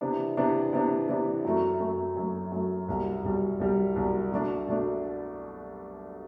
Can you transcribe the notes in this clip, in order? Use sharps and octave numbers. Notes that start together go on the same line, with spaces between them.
C3 E3 B3 D4
C3 E3 B3 D4
C3 E3 B3 D4
C3 E3 B3 D4
F#2 F#3 A3
F#2 F#3 A3
F#2 F#3 A3
F#2 F#3 A3
C2 B2 G3
C2 B2 G3
C2 B2 G3
C2 B2 G3
B2 A3 D4
B2 A3 D4